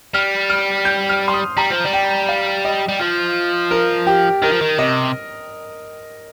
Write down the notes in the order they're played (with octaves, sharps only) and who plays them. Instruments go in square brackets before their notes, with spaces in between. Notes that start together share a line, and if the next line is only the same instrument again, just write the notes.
[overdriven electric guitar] G3 [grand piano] F6
[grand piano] F6
G6
F6
C6
D#6
[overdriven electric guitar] G3 [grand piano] A#5
[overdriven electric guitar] F3
G3
[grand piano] G5
F5
D#5
[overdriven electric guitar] G3
F3
[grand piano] A#4
G4
[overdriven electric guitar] D#3 [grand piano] A#4
[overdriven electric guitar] F3
D#3
[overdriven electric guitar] C3 [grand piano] D#5